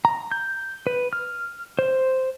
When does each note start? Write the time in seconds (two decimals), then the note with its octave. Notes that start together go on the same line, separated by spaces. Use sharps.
0.05 A#5
0.32 G6
0.87 B4
1.13 F6
1.79 C5